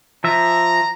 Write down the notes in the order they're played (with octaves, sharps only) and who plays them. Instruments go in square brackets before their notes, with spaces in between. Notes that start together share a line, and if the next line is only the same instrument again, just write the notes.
[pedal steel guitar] F3 E5 [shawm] A#5